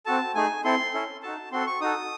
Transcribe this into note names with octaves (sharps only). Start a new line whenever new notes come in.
C4 F#4 A4 A5
A3 D#4 G#4 G#5
C4 E4 A4 C6
C#4 E4 A4
D#4 F#4 A4 A5
C4 F#4 A4 C6
C#6
D#4 F#4 A4 D#6